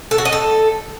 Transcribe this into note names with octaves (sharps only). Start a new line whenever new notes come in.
A4
F#4
D#5
A4